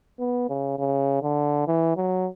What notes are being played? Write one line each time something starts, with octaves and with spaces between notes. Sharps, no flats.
B3
C#3
C#3
D3
E3
F#3